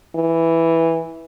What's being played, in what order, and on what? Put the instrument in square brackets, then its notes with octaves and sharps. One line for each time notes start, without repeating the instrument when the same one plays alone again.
[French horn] E3